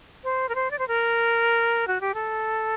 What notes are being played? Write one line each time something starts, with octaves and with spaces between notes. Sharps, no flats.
C5
A#4
C5
D5
C5
A#4
F#4
G4
A4